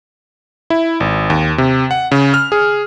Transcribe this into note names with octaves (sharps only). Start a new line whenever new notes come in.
E4
G#1
D#2
C3
F#5
C#3
F6
G#4